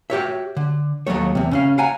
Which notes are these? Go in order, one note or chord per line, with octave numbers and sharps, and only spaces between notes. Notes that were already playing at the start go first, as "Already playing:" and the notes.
F#4 G4 C#5 E5
D3
D#2 F#3 G#3 A3 C#5
E2 C3
C#3 C#4 F5
F5 F#5 G#5 A#5